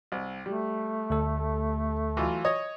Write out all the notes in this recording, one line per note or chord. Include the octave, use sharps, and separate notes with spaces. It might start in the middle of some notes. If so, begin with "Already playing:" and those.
C2
G3 A3
D2 A4
E3 F#3 F4
C#5 D#5 D#6